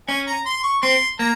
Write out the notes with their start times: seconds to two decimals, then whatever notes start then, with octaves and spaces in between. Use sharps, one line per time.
0.08 C#4 G#5
0.27 A#5
0.46 C6
0.64 C#6
0.82 C4 C6
1.19 A#3 A#5